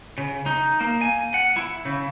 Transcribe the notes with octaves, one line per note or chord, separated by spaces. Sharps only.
C#3
D#4
A#3
G#5
F#5
E4
C#3